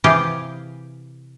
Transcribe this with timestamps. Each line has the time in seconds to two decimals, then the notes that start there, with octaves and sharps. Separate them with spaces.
0.04 C3 E3 G4 G#4 F5 G5